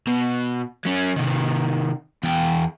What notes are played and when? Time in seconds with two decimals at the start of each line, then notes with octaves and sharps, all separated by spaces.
0.07 B2
0.86 F#3 C#4
1.16 C3 D#3
2.23 E2 G5